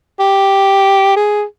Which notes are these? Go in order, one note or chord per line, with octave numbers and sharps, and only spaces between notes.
G4
G#4